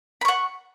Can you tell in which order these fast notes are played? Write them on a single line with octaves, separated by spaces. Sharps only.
B5 C#6 F#5